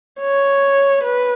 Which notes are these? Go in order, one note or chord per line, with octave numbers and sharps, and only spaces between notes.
C#5
B4